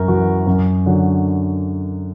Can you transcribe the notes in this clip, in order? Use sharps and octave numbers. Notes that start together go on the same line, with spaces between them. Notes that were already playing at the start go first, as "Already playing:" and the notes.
Already playing: F#2 A#4
E3 F#4
F#2
D3 F#3